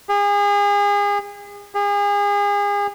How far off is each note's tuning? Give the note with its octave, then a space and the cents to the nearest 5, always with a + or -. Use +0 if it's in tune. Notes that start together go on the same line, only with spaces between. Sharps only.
G#4 -35
G#4 -35